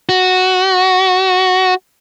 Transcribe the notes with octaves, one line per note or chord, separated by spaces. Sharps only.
F#4